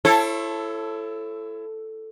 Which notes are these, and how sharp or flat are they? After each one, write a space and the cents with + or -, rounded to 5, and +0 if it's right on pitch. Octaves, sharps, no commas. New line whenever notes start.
E4 +30 A4 +0 C#5 -35